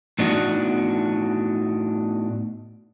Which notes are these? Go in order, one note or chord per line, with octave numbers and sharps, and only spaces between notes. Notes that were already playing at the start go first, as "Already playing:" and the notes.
A2 B3 D4 D#4 F#4